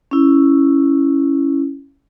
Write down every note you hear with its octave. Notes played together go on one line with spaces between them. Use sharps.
C#4 E4